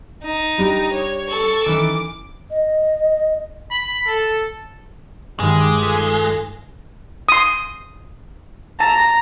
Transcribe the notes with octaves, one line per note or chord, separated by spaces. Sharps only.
D#4
G3 D4 G4
C#5
A4 C#6
D#3 E3 C#4 D6
D#5
B5
A4
G2 D#3 G3 G#3
D6 G6 D#7
F4 A4 B6
C6 D#6
A5 A#5